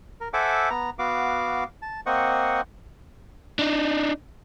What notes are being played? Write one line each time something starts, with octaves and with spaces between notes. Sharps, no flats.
A#4
A4 C5 E5 F#5 G#5 D6
B3 A#5
B3 F#4 F5 D6
A5
A#3 C4 C5 D#5 F#5 C#6
D4 D#4